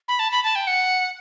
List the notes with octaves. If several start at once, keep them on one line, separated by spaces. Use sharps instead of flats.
B5
A5
B5
A5
G5
F#5